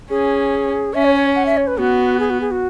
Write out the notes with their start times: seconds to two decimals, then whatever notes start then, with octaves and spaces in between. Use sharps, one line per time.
0.10 C#4 G#4
0.94 C#4 E5
1.05 C#5
1.15 C#5
1.36 F#5
1.46 E5
1.57 C#5
1.67 B4
1.78 B3 F#4
2.20 G#4
2.30 F#4
2.41 G#4
2.51 F#4